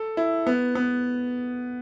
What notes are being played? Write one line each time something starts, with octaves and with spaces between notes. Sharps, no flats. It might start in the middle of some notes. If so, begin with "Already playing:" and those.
Already playing: A4
E4
B3
B3